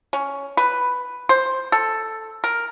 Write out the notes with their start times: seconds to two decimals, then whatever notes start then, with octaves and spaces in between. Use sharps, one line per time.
0.13 C#4
0.57 B4
1.29 C5
1.72 A4
2.44 A#4